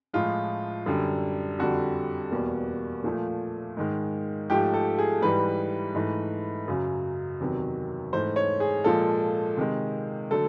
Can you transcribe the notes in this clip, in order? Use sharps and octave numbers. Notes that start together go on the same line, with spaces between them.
A2 F3 G#3 F4
F#2 D3 G3
F2 D3 G3 F#4
E2 B2 G3 A#3
A#2 F3 A3
G#2 D#3 G#3
G#2 F3 A3 G4
A4
G#4
G#2 E3 G3 B4
G#2 E3 A3
F#2 C#3 F#3
E2 C3 D#3 F#3
G#2 E3 A3 C5
C#5
G#4
A#2 F3 G#3 A4
C3 D#3 G#3
D3 F#3 A3 A4